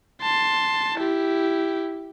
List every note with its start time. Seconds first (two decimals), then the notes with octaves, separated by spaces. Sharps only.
0.22 A5 C6
0.98 E4 G4